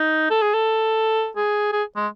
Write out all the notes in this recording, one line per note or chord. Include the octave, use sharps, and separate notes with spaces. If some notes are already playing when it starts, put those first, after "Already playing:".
Already playing: D#4
A4
G#4
A4
G#4
G#4
G#3